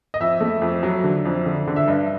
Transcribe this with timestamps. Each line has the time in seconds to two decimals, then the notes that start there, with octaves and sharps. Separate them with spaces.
0.14 D#5
0.20 F2 E5
0.41 A3
0.62 F2
0.83 F#3
1.04 D3
1.25 F2
1.46 D3
1.67 D3
1.76 E5
1.88 G2 D#5